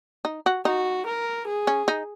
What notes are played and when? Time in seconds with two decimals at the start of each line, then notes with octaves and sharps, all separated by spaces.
0.25 D#4
0.46 F#4
0.65 D#4 F#4
1.06 A#4
1.47 G#4
1.67 C#4
1.88 D#4